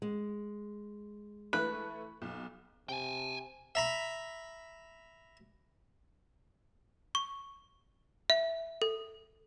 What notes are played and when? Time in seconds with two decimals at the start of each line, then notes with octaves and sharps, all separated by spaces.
0.02 G#3
1.53 E3 A3 B4 F#6
2.22 B1
2.89 C3 G5 G#5
3.75 E5 A#5 B5
7.15 C#6
8.30 E5
8.82 A4